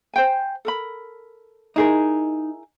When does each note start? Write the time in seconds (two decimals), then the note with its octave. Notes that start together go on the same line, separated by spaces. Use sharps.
0.13 C5 G5 G#5
0.65 A4 A#4 B5
1.76 D#4 E4 G#4 A#4